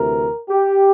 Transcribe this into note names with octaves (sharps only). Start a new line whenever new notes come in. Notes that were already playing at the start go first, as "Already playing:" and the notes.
Already playing: D2 C3 E3 A#4
G4